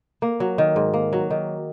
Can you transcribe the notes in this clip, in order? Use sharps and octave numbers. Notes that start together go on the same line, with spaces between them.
A#3
F#3
D#3
G#2
A#3
F#3
D#3